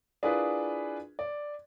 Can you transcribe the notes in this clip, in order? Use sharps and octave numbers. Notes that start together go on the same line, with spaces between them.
D4 E4 F4 G#4 A#4 B4
D5